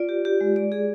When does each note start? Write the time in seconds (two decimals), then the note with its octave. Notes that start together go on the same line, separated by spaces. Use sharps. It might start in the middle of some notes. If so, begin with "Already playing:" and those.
Already playing: F4 D5
0.09 G4
0.25 G4
0.41 G#3
0.56 D5
0.72 G#4